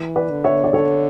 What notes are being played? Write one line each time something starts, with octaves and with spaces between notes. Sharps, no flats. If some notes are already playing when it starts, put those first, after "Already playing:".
Already playing: E3
B4 D5
D3
C#5 E5
D5
D3 A4 C#5